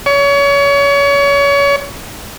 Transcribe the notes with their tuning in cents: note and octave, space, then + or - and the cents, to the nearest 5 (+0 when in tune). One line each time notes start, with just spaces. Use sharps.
C#5 +30